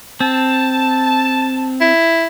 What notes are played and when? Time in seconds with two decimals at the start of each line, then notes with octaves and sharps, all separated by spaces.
0.20 C4 A5
1.81 E4